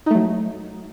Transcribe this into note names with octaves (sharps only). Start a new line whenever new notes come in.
F#3 A3 D#4